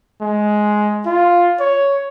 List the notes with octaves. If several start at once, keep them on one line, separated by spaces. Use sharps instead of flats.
G#3
F4
C#5